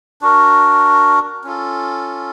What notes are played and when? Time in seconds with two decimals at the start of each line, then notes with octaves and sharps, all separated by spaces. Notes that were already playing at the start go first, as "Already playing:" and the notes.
0.22 D4 F#4 A#4
1.44 C#4 F4 A4